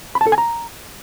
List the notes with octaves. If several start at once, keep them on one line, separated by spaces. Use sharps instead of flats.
B5
A5
A4
G#5
A#5